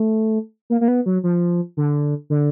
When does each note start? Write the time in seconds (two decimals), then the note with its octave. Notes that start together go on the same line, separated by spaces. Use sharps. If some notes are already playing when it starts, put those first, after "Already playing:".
Already playing: A3
0.70 A#3
0.81 A#3
0.88 B3
1.06 F#3
1.24 F3
1.77 D3
2.30 D3